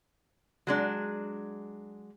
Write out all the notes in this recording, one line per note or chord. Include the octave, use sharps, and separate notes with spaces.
F#3 G#3 D4